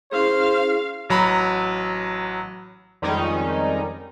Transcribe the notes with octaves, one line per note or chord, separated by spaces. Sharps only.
C#4 E4 G#4 C5 F5
A1 F#3 A#5 B5
F2 D#3 G3 G#3 C#4 D#4